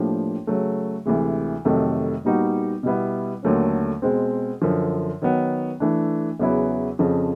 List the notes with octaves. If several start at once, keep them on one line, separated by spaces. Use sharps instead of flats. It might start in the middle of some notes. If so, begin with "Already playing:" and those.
Already playing: A2 F3 A#3 D4 G4
C#3 F#3 A3
D2 C3 E3 G#3
F2 C3 D#3 F#3 A3
A#2 G3 B3 D#4 F#4
B2 G3 B3 E4
D#2 D3 F#3 A3 C#4
B2 G#3 C4
F#2 D3 F3
D#3 F#3 B3
E3 A3 D4
E2 C#3 F#3 B3 E4
F2 C#3 F3